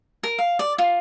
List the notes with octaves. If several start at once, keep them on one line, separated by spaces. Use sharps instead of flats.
A#4
F5
D5
F4